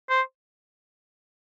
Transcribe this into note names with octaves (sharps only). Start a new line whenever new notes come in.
C5